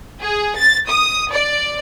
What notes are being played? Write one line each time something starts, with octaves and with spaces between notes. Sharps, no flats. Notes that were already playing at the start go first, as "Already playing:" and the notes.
G#4
A6
D#6
D5